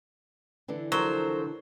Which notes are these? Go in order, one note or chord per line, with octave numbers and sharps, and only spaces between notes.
D3 E3 D4
F3 F#3 A4 A#4 C5